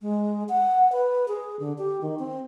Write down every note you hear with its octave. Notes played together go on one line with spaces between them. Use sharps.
G#3
F#5
B4
G#4
D3
G4
D#3
C4